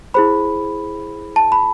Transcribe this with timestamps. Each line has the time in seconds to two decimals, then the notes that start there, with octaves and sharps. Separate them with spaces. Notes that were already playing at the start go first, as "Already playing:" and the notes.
0.14 E4 G#4 C5 B5
1.36 A5
1.52 B5